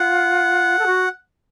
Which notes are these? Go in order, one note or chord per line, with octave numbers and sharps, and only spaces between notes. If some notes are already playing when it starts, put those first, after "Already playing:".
Already playing: F4 F#5
A4
F#4